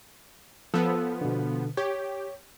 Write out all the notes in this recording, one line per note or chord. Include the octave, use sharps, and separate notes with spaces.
F3 B3 A4 E6
B2 D3
G4 C#5